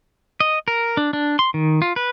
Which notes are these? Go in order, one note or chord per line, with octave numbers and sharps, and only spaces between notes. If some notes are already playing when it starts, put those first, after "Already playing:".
D#5
A#4
D4
D4
C6
D#3
F4
B4